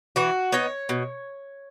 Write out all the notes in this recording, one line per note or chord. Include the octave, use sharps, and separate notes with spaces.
E3 F#4
B3 D#4 C#5
B2